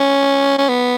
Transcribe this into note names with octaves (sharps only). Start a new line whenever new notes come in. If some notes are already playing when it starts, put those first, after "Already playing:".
Already playing: C#4
C#4
B3